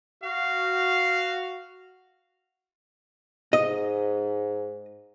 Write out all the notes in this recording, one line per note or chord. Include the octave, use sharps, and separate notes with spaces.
F#4 F5
G#2 D#5